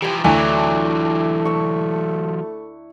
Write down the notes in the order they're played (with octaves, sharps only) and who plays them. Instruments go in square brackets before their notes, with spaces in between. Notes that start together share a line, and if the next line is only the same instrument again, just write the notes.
[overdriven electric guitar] E3 F3 [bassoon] G4 [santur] G5 A#5
[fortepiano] D2 [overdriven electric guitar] E3 F#3 [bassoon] A3 [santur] D4 E4
[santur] C#6 E6